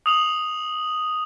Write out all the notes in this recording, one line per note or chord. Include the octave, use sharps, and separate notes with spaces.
D#6 F7 F#7